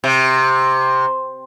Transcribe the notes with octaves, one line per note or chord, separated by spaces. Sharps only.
C3